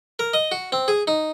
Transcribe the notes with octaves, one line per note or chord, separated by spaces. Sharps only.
A#4
D#5
F#4
C4
G#4
D#4